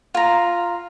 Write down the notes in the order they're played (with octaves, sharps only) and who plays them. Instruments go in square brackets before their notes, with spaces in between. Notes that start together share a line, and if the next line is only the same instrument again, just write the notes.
[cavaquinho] F4 A#5